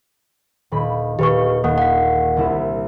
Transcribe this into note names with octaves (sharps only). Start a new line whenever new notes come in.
D#1 B5
D#1 G4 B4 C#6
D#2 A#3 F#5
F#5 B6
C2 E4